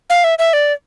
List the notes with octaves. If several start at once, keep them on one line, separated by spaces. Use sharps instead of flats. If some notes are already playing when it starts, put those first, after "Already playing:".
F5
E5
E5
D5